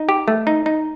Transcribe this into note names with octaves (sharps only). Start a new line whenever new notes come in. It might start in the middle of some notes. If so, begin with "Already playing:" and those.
Already playing: D#4
G4
A3
D#4
D#4